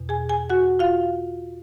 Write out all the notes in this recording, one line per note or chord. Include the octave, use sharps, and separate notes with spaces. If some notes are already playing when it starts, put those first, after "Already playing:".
Already playing: E2 B2
G#4 G#5
G#4 G#5
F#4 F#5
F4 F5